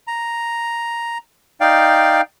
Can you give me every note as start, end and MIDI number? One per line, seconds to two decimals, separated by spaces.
0.08 1.18 82
1.61 2.21 63
1.61 2.21 74
1.61 2.21 77
1.61 2.21 79